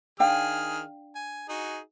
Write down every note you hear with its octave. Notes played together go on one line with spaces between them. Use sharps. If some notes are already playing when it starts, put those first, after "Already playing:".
D#3 D4 G#4 F5 G5 F6
G#5
D#4 F#4 G#4